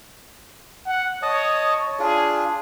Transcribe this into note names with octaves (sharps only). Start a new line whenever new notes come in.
F#5
C#5 D#5 A5 D#6
D4 F4 G#4